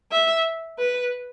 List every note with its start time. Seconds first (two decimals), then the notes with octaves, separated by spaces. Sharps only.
0.12 E5
0.79 B4